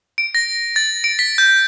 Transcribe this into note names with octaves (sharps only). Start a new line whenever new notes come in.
D7
A#6
A6
D7
B6
G6